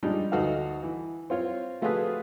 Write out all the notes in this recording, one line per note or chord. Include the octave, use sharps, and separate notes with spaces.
F3 G3 G#3 D4 D#4
D2 D#4 F#4 A4 F5
E3
C4 F4 C#5
F3 A3 F4 F#4 G#4 B4